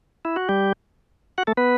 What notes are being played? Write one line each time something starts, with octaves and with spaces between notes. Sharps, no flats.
E4
F#4
G3 G4
F#4 F#5
A3 A4
B3 B4